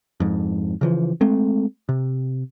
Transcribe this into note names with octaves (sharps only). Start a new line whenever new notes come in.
F2 G#2
C#3 E3 F3
G#3 A3 C4
C3